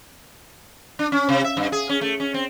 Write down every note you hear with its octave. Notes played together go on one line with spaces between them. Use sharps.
D4
C#4
C3
E5
G2
G#4
C#4
A3
C#4
C4